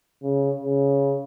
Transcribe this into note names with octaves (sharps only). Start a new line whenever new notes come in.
C#3
C#3